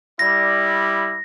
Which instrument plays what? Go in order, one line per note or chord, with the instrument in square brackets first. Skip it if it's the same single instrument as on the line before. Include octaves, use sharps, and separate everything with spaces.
[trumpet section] G3 E4 D5 [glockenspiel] A#6